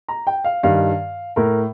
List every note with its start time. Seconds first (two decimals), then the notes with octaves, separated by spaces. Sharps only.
0.08 A#5
0.27 G5
0.44 F5
0.63 G2 D#3 F5
1.36 A2 A#4